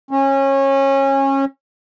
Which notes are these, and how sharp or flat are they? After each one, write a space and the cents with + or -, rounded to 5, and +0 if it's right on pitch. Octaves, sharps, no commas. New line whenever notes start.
C#4 -25